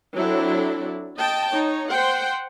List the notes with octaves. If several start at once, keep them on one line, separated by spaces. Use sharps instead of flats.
F#3 C4 D4 E4 A4
D#5 G5 A5
D#4 C#5
C5 F#5 G5 C6